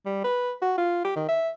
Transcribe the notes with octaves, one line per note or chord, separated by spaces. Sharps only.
G3
B4
F#4
F4
G4
D#3
E5